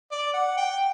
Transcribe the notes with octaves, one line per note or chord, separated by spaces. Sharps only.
D5
F#5
G5